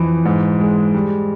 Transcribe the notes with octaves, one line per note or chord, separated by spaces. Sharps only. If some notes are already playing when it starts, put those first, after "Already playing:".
Already playing: F2 E3
G#2
G#3
G3